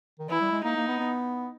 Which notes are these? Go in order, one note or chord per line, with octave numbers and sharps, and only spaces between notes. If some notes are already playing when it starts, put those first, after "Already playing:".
D#3
E3 E4
G3
G#3
A#3 D#4
A#3
B3
B3